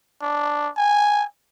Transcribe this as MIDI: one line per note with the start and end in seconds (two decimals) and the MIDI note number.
0.22 0.69 62
0.77 1.25 80